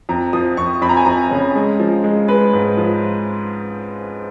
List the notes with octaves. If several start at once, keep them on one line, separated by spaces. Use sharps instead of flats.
F2 A#5
F3 D#6
F2 C#6
F2 B5
A#5
G#5
F2 A#5
C#3
G#3
F3
G#3
G#3 B4
G#2
F3